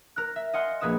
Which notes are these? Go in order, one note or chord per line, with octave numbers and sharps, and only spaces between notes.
A#4 F#6
E5
D#5 F5 F#5 G#5 C6 F6
A#1 A#3 G#4 B4 D#6 E7